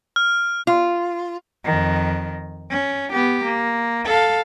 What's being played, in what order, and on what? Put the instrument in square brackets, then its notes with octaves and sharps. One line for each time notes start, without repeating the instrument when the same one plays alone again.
[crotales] F6
[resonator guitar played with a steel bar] F4
[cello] F2 D#3
C#4
B3 G4
A#3
A4 F5